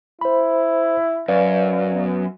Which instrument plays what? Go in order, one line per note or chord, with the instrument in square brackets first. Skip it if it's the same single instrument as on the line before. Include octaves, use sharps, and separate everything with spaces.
[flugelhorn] E4 [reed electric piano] C5 B5
[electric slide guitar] F#2 [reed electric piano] B4 D5 F5
[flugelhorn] B3